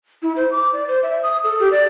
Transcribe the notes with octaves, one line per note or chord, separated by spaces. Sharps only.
E4
C5
D6
D5
C5
E5
D#6
A4
G4
D5